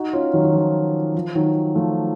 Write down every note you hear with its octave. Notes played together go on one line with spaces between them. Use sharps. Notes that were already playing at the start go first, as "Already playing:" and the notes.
Already playing: D#4 F#4
C#4 F4
D#3 F#3
D#3
F3
F3
D#3 F#3
F3 A3